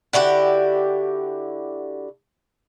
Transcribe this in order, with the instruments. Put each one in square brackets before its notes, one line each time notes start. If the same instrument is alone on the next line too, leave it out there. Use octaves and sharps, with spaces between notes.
[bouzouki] D3 E4 F#4 G4